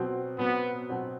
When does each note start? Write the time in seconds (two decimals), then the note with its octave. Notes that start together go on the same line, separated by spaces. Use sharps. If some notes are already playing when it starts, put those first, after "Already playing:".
Already playing: B2 F#3 C4
0.38 B2 F#3 B3 C4
0.89 B2 F#3 C4